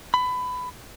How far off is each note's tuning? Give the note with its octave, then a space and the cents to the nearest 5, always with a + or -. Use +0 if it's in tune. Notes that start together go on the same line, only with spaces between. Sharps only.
B5 +20